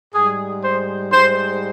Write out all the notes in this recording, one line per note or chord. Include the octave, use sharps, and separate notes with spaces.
G#2 G3 G#4
C5
G#2 G3 C5